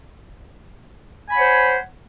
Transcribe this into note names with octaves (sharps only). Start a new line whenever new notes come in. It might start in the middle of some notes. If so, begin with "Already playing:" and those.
C5 C#5 F#5 G#5 B5